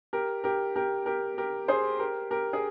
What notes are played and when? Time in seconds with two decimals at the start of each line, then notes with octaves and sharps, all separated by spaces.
0.13 G4 A#4
0.44 G4 A#4
0.76 G4 A#4
1.06 G4 A#4
1.38 G4 A#4
1.68 G#4 C5
1.99 G4 A#4
2.31 G4 A#4
2.53 G#4